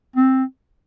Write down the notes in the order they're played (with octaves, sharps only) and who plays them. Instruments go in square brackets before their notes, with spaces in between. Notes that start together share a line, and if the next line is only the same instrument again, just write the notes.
[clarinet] C4